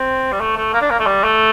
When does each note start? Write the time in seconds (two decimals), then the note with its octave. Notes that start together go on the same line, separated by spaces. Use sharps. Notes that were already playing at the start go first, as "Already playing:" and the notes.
Already playing: C4
0.32 G3
0.41 A3
0.56 A3
0.73 A#3
0.81 D4
0.90 A#3
0.99 A3
1.06 G3
1.24 A3